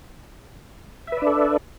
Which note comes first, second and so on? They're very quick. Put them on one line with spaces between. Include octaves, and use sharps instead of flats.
E5 B4 D5 D4 A4